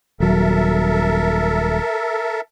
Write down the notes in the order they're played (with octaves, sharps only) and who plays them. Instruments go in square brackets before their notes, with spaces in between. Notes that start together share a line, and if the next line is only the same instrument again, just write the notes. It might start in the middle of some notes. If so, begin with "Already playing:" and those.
[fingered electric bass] D#1 F#3 [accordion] A4 A#4 E5